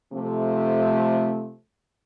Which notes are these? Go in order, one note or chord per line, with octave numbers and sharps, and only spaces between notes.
C3 F3 A3